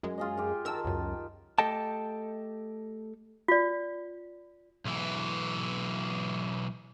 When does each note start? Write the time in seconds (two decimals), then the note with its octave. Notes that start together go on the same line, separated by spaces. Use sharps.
0.03 F#2 G#3
0.18 F4 G#4 D#5
0.37 F4 G4
0.65 D#3 A#4 A5 E6
0.85 C#2 F#2
1.59 A3 G4 A4 D#5 G5 A5
3.48 F4 D5
4.85 B1 E3